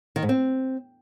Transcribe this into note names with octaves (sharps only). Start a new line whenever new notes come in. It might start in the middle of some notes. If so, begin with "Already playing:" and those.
D#3
G#2
C4